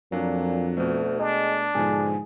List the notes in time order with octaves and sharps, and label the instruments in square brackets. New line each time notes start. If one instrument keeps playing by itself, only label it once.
[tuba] F2 [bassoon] A#2 [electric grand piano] F#3 D4
[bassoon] D2 [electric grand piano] B2 A3
[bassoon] G#3 [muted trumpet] D4
[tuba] G#2 [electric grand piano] B2 D3 F3 [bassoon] G#4